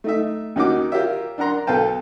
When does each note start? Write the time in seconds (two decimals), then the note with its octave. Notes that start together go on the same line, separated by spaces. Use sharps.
0.04 A3 D#4 E5
0.56 D#2 D#3 C#4 D#4 F#4 D6
0.92 F4 G4 A#4 C#5 E5
1.38 D4 A#4 F#5 A#5 C6
1.67 B1 A4 B4 F5 G5 A5